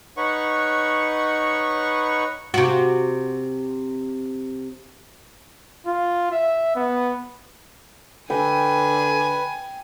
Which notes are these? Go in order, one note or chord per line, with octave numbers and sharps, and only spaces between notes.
D#4 B4 C#5 F#5 C#6
C3 F#4
F4
E5
B3
D3 B4 G5 G#5